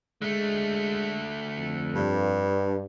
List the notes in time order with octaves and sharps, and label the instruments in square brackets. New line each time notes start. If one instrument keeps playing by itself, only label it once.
[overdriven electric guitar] D3 A3 [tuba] G#3
[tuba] F2
[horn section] G2